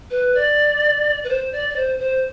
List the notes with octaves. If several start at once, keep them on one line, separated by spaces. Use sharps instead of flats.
B4
D5
B4
C5
D5
D5
C5
C5